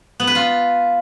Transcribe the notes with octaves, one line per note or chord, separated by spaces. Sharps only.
B3
B4
F4